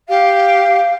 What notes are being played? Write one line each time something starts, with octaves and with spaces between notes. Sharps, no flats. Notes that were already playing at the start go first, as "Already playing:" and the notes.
G4 F5